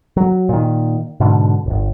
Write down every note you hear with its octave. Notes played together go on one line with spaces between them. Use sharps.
F#3
A#2 D#3
G#2 B2 D3
D1 G1